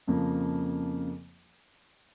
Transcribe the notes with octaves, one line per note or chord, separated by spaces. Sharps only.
F2 C#3 F3 A#3